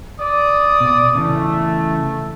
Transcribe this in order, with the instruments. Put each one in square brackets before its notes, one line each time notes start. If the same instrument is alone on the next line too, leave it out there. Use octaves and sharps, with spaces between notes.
[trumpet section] D5 D#6
[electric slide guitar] B2
[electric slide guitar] C#3 E3 [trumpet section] A3